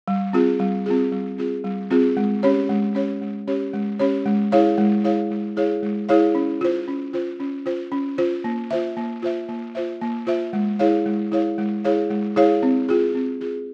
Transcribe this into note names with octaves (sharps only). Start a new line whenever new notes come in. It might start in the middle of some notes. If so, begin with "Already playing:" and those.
G3
C4 F4 G#4
G3
C4 F4 G#4
G3
C4 F4 G#4
G3
C4 F4 G#4
G#3
C#4 G4 C#5
G#3
C#4 G4 C#5
G#3
C#4 G4 C#5
G#3
C#4 G4 C#5
G#3
E4 G#4 C#5 F5
G#3
E4 G#4 C#5 F5
G#3
E4 G#4 C#5 F5
G#3
E4 G#4 C#5 F5
C#4
F4 C5
C#4
F4 C5
C#4
F4 C5
C#4
F4 C5
A#3
F4 C5 E5
A#3
F4 C5 E5
A#3
F4 C5 E5
A#3
F4 C5 E5
G#3
E4 G#4 C#5 F5
G#3
E4 G#4 C#5 F5
G#3
E4 G#4 C#5 F5
G#3
E4 G#4 C#5 F5
C4
F4 G#4
C4
F4 G#4